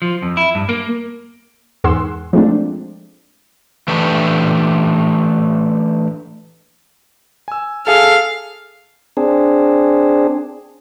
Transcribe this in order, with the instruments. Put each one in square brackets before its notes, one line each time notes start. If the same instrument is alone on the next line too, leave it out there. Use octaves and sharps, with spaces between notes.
[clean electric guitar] F3
F2
E4
G2
A#3
[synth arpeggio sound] E2 G#2 G#4 F#5 C6 E6
F3 G#3 A3 C4 D4
[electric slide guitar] E3 A3 D4 G4
[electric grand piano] G#5 E6
[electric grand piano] G#4 A4 [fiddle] F5
[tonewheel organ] C4 D4 G#4